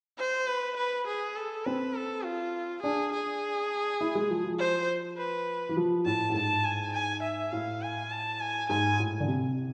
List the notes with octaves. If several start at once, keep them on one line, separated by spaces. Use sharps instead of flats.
C5
B4
B4
G#4
A4
C4 B4
A4
F4
D4 G#4
G#4
E4
G#3
F3
F3
C5
B4
E3
F3
A2 A5
A2
G#2 A5
G#5
G#5
E5
A2 F5
G#5
A5
G#5
G#2 G#5
A2
D3
C3